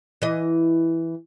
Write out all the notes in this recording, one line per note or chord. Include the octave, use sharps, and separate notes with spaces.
E3 D#5